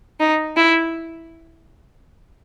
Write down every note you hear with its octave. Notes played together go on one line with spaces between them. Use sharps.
D#4
E4